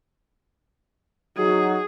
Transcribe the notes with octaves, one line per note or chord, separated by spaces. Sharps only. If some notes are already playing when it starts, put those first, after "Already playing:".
F#3 D#4 F#4 G#4